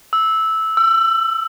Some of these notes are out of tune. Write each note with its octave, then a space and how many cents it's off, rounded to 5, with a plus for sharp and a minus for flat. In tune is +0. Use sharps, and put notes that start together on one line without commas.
E6 -10
E6 +25